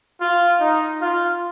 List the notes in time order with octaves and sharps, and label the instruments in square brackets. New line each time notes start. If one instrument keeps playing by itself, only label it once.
[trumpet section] F4
D#4
F4